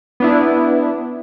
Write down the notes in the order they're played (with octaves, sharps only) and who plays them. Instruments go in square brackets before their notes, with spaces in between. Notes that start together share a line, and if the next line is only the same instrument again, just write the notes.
[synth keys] B3 D4 E4